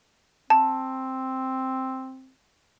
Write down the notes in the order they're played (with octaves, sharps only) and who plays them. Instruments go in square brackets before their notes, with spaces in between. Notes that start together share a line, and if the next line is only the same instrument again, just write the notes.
[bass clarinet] C4 [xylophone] A5